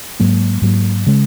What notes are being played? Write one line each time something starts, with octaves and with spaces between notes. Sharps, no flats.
G#2 F#3 A#3
G#2 F#3 A#3
C#3 G#3